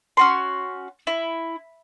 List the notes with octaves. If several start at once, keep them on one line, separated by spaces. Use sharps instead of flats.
C#4 F#4 C6
E4